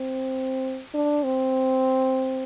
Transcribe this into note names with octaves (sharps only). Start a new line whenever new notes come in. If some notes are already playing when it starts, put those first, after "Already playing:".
Already playing: C4
D4
C4